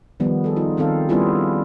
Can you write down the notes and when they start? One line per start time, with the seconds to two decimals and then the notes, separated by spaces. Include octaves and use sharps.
0.20 D#3 F3 G3 B3
0.44 G#4 A4
0.56 D#4 F4
0.77 D#3 C4 D#4 A4 F5
1.09 G3 B3 C#4 E4 F4 G#4